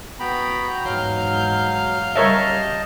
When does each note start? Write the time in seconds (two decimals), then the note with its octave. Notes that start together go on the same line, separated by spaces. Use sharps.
0.19 B3 F#4 G5 A#5 B5
0.85 E2 G#2 F#3 F5 F6 G6
2.16 C#3 G3 A#4 C#5 D#5 E5 A5